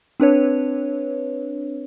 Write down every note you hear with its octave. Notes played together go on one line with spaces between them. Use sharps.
C4 D4 B4 C#5